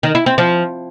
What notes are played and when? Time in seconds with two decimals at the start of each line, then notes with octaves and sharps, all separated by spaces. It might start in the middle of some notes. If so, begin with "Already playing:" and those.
0.03 D#3
0.15 E4
0.26 C4
0.38 F3